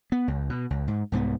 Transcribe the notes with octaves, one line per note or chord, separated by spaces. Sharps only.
B3
C#2
B2
C#2
G#2
C2 G#2 E3 B3